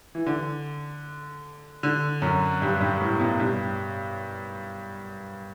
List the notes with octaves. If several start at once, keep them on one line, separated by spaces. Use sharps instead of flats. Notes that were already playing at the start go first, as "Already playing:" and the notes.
E3
D3
D3
F#2
G2
G2
A2
B2
G2